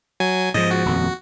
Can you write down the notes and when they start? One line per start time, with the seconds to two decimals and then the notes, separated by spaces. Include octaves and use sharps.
0.20 F#3 G#5
0.54 G#2 F3 D#5
0.71 F#4
0.85 D#1 F2